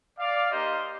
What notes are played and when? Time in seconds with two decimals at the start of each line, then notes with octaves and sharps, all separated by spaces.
0.18 D5 F5
0.50 A#3 D#4 G4 C5 D#5